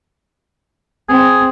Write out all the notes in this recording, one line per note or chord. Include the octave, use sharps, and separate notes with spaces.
C4 G#4